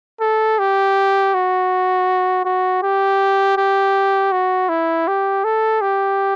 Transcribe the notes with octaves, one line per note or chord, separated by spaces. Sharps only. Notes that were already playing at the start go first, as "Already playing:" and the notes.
A4
G4
F#4
F#4
G4
G4
F#4
E4
G4
A4
G4